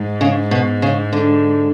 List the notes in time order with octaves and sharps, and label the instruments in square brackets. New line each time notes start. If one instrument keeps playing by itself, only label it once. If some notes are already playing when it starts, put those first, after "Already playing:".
Already playing: [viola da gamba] G#2
[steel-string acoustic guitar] C#3
B2
C#3
D3